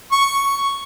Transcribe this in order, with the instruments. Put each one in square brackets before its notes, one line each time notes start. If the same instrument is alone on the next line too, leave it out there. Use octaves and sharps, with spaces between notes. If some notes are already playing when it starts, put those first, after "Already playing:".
[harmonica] C#6